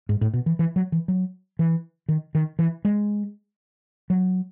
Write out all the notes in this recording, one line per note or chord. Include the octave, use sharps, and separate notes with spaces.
G#2
A2
B2
E3
E3
F#3
E3
F#3
E3
D#3
D#3
E3
G#3
F#3